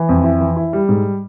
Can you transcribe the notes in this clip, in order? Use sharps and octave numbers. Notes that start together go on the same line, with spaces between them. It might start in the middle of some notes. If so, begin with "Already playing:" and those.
Already playing: E3
F2
E4
E3
E4
G3
G#2